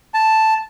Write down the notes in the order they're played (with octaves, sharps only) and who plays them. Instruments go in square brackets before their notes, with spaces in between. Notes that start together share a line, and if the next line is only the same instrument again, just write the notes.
[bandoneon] A5